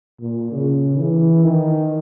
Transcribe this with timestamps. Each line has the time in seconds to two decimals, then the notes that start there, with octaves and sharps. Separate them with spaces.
0.21 A#2
0.52 C#3
0.98 E3
1.44 D#3